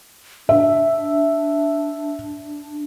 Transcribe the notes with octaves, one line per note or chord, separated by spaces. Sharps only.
D4 E5